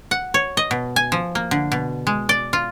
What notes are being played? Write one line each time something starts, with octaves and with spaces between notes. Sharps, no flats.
F#5
C#5
D#5
B2
G#5
F3
A#3
D3
B2
G#3
D5
F4